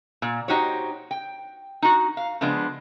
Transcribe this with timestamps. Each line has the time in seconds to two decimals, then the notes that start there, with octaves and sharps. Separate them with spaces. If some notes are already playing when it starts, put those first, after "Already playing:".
0.22 A#2
0.48 D#4 F#4 G4 C5 C#5
1.11 G5
1.82 D#4 F#4
2.17 F5
2.41 C#3 F3 G#3 B3 D4